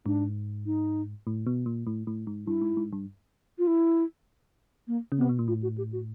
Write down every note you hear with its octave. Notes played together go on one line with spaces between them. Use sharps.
G#2 D4
D#4
A2
B2
A#2
A2
A2
G#2
G2 E4
G#2
G#2
G2
F4
E4
A#3
C#3
C3 B3
B2
A#2
A2 F4
F#4
G4
F#4